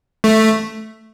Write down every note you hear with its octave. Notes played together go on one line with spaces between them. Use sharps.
A3